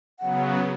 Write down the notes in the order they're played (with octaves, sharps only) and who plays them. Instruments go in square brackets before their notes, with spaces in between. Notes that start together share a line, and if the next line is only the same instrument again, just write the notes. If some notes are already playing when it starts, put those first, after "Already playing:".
[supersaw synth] C#3 F#3 B3 [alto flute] F#5